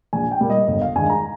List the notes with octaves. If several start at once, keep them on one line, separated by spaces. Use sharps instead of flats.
A#1 G#5
G5
A#2 G3 A#3
D#5
G1 D#5
F5
G2 D#3 G#3 G#5
A#5